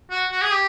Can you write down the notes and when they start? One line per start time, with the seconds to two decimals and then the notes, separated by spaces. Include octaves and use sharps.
0.11 F#4
0.31 F#4
0.42 G#4
0.51 G4